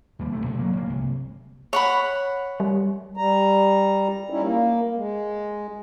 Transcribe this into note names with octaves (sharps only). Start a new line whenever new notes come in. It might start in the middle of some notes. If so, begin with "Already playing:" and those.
D#2 G3 A#3
D#1 C3 A3
B1 G2
F#3 A#3
G1 A#3
C2
C#5 F#5 B5
G3
G3 A#5
G3 C#4 D#4 E4
A#3
G#3